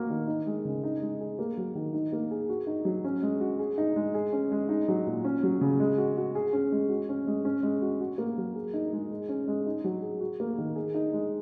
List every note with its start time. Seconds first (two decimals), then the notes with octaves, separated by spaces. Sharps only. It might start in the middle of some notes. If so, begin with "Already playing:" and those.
Already playing: A#3 F#4
0.10 D#3
0.27 D#4
0.47 G#3
0.65 C#3
0.84 D#4
1.02 G#3
1.21 G#4
1.39 A#3
1.57 F#3
1.75 D#3
1.93 D#4
2.13 A#3
2.31 G#4
2.49 F#4
2.67 D#4
2.85 F#3
3.04 C#4
3.22 G#3
3.40 F#4
3.59 G#4
3.78 D#4
3.96 G#3
4.14 G#4
4.32 C#4
4.52 G#3
4.69 D#4
4.88 F#3
5.06 A#2
5.24 C#4
5.43 F#3
5.61 C#3
5.80 G#3
5.98 F#4
6.17 F#4
6.35 G#4
6.53 C#4
6.72 G#3
6.89 F#4
7.09 C#4
7.27 G#3
7.45 C#4
7.63 G#3
7.82 F#4
8.00 F#4
8.18 A#3
8.38 F#3
8.55 G#4
8.73 D#4
8.93 G#3
9.10 G#4
9.29 C#4
9.48 G#3
9.66 D#4
9.84 F#3
10.02 G#4
10.20 F#4
10.40 A#3
10.58 D#3
10.75 G#4
10.94 D#4
11.13 G#3